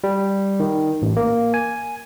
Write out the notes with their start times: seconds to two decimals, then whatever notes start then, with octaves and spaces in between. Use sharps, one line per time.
0.04 G3
0.60 D#3
1.02 A1
1.17 A#3
1.54 G#5